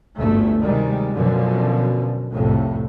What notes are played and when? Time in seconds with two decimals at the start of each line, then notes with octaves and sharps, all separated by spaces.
0.17 G1 D2 A3
0.61 C3 D#3 G3 G#3
1.15 F#2 B2 D3 F3 F#3
2.32 C2 F2 A2 C3